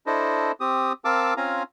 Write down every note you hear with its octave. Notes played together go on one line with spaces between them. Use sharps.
D4 E4 A4 C5 D#5
C4 G4 D#6
C4 A#4 F5 A5 D6 E6
C4 C#4 F4 F5 G#5 A#5